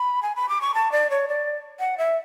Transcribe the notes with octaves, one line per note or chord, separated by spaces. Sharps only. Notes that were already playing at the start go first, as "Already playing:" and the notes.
Already playing: B5
G#5
B5
D6
C#6
A5
D5
C#5
D5
F#5
E5